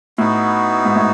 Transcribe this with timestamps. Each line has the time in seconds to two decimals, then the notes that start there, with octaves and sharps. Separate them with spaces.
0.18 A2 B3 D#4 F#4
0.85 G#2
0.96 A2